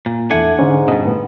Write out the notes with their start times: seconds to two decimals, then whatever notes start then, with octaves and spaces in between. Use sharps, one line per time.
0.06 A#2
0.30 E2 A3 D4 E4 F#5 G#5
0.59 G#2 D3 C#4
0.88 G2 B2 D#5
1.05 A2 B3